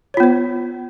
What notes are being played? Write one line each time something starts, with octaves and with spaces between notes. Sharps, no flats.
B3 F4 C5 C#5